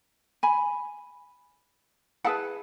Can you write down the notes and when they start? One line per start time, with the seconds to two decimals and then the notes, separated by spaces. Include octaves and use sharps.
0.43 G#5 B5
2.24 E4 G#4 B4 F#5 A5